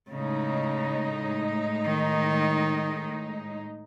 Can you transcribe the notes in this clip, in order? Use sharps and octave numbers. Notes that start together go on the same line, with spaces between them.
A2 C#3 G#3 D#4
D#3